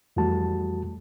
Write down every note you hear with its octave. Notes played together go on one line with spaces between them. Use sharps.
F2 E3 G3 A3 F#4 A5